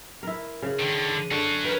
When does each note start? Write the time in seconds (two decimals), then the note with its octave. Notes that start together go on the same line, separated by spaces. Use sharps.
0.23 E4 A#4
0.62 C#3
0.80 D3 D#3
1.31 D3 C#4 F#4
1.64 A#4 B4